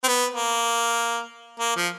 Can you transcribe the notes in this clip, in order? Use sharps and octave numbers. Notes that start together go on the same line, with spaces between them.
C4
B3
A#3
A#3
F3